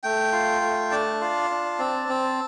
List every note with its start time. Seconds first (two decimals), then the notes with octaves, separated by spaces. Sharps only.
0.03 A3 G5
0.32 F4
0.62 A3
0.91 D4 A5
1.21 F4
1.50 D4
1.79 C4
2.09 C4